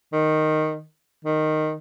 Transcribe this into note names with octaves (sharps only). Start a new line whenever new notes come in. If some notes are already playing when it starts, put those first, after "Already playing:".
D#3
D#3